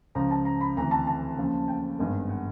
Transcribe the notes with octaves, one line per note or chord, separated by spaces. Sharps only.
C#2 C#3 F3 A#5
A5
A#5
B5
D2 C3 E3 A#5
A5
A5
D#2 C#3 F3
G5
G#1 G2 D#3 G#3 B3
F#5